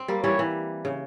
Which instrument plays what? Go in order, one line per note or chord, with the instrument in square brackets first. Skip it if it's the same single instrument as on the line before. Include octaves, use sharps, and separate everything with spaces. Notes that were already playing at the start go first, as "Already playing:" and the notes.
Already playing: [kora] C4
G3 A#3
[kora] E3 G3 [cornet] C#5
[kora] E3
C#3